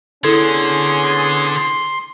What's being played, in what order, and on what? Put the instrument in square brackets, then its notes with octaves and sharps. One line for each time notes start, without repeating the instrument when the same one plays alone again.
[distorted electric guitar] D3 [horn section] B3 C#4 G#4 [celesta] E4 A4 G#6 [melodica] C6